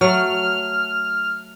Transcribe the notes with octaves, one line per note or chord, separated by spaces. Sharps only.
F#3 A3 F6